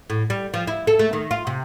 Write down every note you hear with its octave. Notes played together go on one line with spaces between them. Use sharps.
A2
G3
F3
E4
A4
A3
D#3
F4
C3